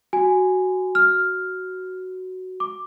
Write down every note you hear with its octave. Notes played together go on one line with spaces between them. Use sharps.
F#4 G#5
F6
D6